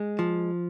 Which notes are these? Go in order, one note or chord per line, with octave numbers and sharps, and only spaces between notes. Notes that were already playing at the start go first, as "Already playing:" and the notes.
Already playing: G#3
F3